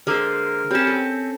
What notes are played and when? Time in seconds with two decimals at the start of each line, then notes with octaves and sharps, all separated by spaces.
0.07 D3 G#3 A#3 A#4 C5
0.71 G3 C4 C#4 A5
0.87 A4